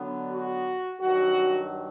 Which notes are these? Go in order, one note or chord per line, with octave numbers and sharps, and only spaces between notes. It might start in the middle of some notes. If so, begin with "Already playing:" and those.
Already playing: D3 F#3 B3 D4
F#4
G2 D#3 F#3 F#4